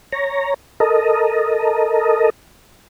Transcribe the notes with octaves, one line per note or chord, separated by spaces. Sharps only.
C#5 A#5
A4 A#4 D#5